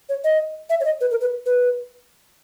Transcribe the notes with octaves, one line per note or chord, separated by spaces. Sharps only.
C#5
D#5
E5
C#5
D#5
B4
A#4
B4
B4